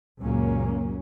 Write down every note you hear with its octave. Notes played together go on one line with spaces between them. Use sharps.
C#2 F#2 A#2 F#3 A#3 C#4